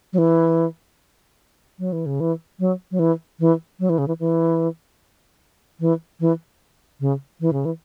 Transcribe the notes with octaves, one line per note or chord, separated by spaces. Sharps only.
F#3
E3
F#3
E3
C#3
E3
F#3
F#3
E3
E3
F#3
E3
C#3
E3
E3
E3
E3
C#3
E3
C#3
E3